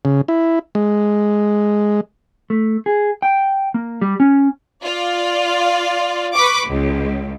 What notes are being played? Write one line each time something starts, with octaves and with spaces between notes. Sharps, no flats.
C#3
E4
G#3
A3
G#4
G5
A#3
G3
C#4
F4 D5
B4 B5 C#6 D6
C#2